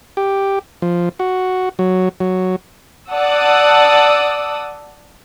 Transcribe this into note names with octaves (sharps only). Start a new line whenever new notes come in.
G4
F3
F#4
F#3
F#3
D5 F#5 A5 D#6 E6